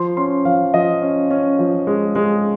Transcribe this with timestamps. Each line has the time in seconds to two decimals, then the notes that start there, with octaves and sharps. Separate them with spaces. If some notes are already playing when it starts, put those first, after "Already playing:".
Already playing: F3 C6
0.17 C#4 C6
0.45 F3 F5
0.74 F3 D#5
1.02 C#4
1.31 C#4
1.59 F3
1.87 G#3
2.15 G#3